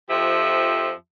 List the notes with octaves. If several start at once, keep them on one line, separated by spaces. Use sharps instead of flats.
F2 F3 G4 E5